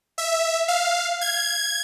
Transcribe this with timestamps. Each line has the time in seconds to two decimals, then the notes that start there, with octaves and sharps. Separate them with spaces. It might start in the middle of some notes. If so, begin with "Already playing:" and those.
0.18 E5
0.68 F5
1.21 G#6